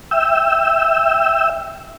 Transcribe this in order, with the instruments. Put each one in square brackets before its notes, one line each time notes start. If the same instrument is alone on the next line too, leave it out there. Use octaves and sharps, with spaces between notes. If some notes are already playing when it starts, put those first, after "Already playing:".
[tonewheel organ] E5 G5 E6